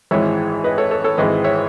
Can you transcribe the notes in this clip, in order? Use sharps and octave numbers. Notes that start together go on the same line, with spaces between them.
G#1 G#2 E3 G#3 C#5 E5
B4 D#5
A4 C#5
A4 C#5
A4 C#5
G#1 G#2 E3 G#3 B4 D#5
C#5 E5